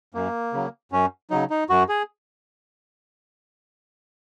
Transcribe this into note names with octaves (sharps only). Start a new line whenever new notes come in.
F#2 A#3
C#3 F#3
F#2 C#4
C#3 F#3 D#4
D#4
F#2 F#4
G#4